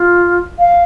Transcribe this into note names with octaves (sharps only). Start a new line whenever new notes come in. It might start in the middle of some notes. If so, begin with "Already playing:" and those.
Already playing: F4
F5